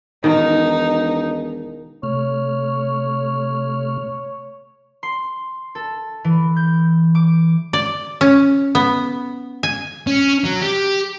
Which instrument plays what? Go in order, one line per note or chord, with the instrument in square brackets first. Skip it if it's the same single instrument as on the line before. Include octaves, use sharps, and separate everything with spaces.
[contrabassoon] E1 [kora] D#3 [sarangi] D#4
[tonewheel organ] C3 A3 F6 [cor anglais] C#5
[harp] C6
A4
E3
G6
D6
[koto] D5
C#4
B3
G#5
[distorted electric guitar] C#4
F#3
G4